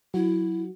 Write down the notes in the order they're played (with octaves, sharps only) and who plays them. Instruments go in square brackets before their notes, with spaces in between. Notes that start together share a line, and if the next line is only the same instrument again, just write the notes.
[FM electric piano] F#3 F#4 [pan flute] E4